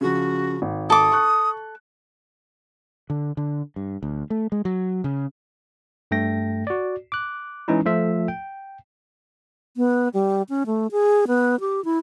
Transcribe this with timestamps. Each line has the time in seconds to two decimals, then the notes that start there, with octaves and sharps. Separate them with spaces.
0.01 C#3 F3 F#4
0.62 G#1
0.90 A4 D6 D#6
1.12 C#6 F#6
3.10 D3
3.37 D3
3.76 G2
4.03 D2
4.30 A3
4.52 G#3
4.65 F#3
5.04 C#3
6.11 G2 A3 G5 A#6
6.67 F#4 D5
7.12 D6 F#6
7.68 E3 G#3 C#4 D#4 E4
7.86 F3 A3 F4 A4 E5
8.28 G5
9.77 B3
10.14 G3
10.49 C#4
10.66 A3
10.92 G#4
11.28 B3
11.60 G4
11.85 E4